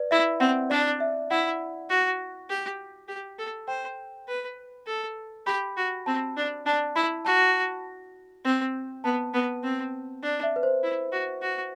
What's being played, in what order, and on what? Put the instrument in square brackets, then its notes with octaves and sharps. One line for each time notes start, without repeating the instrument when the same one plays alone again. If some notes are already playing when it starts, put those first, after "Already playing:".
Already playing: [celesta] B4 D5
[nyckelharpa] E4 [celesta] E5
[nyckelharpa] C4 [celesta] F#5
[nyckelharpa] D4 [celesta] D5
[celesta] E5
[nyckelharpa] E4 [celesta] F#5
[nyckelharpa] F#4
G4
G4
A4
[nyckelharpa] C5 [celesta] G5
[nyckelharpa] B4
A4
[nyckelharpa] G4 [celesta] B5
[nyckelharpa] F#4
[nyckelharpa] C4 [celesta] A5
[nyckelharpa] D4
[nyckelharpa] D4 [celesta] A5
[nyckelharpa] E4 [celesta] B5
[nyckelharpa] F#4 [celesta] A5
[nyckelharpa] C4
[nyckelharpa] B3 [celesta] A5
[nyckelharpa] B3
C4
D4
[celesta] E5
B4
C5
[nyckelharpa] E4
F#4
F#4